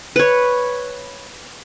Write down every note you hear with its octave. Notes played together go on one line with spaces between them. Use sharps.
B4 C#5